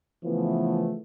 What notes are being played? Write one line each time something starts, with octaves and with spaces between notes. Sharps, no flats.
C#3 E3 F3 A3 B3